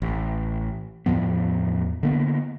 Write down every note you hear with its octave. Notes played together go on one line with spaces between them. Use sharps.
A1
E2 A2 F3 B3
D3 A#3 B3